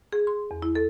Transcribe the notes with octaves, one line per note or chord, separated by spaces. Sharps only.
G#4
C6
E2
E4
A4